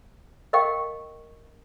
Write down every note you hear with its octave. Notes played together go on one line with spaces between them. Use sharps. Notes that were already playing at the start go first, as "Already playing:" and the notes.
A#4 D#5 F5 G5 C#6